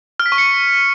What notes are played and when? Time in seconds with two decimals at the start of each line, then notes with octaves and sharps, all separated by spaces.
0.20 F6
0.26 B6
0.32 C#6
0.38 C#7